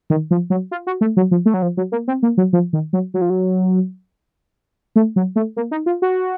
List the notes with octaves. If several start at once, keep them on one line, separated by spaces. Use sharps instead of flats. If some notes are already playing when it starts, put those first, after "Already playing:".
D#3
F3
F#3
F4
F#4
A3
F#3
F3
A3
F#3
F3
F#3
A#3
C4
A#3
F#3
F3
D#3
F#3
F#3
F3
F#3
A3
F#3
A3
A#3
D#4
F4
F#4